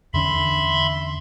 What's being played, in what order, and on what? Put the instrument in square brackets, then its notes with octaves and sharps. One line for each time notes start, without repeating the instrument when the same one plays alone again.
[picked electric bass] E2 D3 C#4 [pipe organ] E5 B5 C6